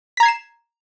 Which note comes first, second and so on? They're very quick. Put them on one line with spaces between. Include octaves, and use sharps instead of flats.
B6 A#5 G#6 C7 E7